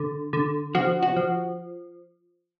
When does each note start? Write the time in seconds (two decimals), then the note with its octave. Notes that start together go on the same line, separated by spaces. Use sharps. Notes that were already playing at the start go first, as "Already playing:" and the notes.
Already playing: D3
0.33 D3
0.75 F3 F#4
1.02 F#4
1.17 F3